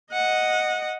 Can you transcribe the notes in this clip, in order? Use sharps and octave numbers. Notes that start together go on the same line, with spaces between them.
D#5 F#5